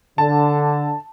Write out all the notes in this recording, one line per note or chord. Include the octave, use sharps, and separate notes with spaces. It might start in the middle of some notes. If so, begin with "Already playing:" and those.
D3 A5